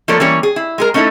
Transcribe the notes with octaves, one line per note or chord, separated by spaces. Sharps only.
F3 A3 A#3 A4 C#5 D5
E3 G3 A#3 C#4 C#5
G#4
E4
G#3 G#4 A#4
A3 C#4 D#4 E4 A4